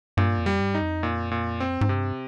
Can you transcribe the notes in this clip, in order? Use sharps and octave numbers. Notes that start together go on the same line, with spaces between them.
G2 A#2
F2
G3
G2
D#4
F2
A#2
A#2
C4
G#2
G2 C3